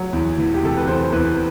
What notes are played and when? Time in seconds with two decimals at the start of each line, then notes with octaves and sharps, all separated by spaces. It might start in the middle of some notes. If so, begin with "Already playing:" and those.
Already playing: F#3
0.13 E2
0.38 E3
0.54 G4
0.63 C3 A4
0.77 B4
0.87 E2 C5
1.12 E2 B4